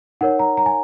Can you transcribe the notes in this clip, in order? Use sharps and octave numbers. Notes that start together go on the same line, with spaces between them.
D#4 A#4 C#5 F#5
A#5
A#5
G#5